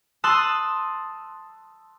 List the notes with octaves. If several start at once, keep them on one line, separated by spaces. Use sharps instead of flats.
A5 C6 D#6 E6 F#6